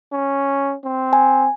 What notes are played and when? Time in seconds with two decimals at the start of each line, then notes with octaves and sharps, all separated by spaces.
0.12 C#4
0.84 C4
1.13 G#5